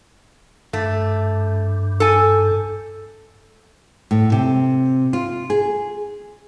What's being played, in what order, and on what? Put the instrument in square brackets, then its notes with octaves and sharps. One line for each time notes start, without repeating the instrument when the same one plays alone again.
[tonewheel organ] G2 [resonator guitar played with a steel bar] A3
[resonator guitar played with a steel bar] A4 G#5
[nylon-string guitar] A2
C3
F4
G#4